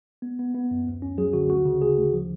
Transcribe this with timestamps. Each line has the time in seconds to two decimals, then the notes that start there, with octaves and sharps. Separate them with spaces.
0.22 B3
0.39 B3
0.54 B3
0.71 F#2
0.87 D2
1.02 C#4
1.18 F#3 G#4
1.33 D3 F#4
1.50 D2 F#4
1.65 C#3
1.82 D2 G#4
1.98 D2
2.14 F3